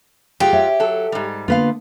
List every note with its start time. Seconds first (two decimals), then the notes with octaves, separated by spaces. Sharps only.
0.40 F#3 F4 G4 G#4
0.53 C#5 E5
0.80 F#3 A4
1.12 G#2 G3
1.48 D3 A#3 B3 F4 B4 F5